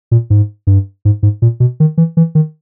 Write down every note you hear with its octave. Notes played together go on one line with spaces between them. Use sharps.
A#2
G#2
G2
G#2
G#2
A#2
B2
D#3
E3
E3
D#3